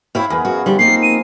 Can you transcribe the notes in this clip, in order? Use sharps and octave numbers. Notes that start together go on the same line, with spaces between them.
C4 E4 C#5 F5 B5
E2 B3 G#4 A#4
F#2 F#4
D3 F3 G3
A#3 C4 D#4 C7
D#7